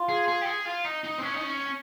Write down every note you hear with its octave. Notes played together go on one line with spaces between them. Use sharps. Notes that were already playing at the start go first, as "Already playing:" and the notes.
Already playing: F4
G#4
G#4
G4
G#4
F4
D#4
D#4
C4
C#4
D#4
C#4